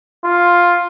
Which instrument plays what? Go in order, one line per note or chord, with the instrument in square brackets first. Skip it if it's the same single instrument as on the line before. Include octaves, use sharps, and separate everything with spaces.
[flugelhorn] F4